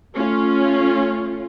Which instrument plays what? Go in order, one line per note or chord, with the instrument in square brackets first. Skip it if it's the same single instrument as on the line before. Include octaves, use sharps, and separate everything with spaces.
[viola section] A3 C#4 F4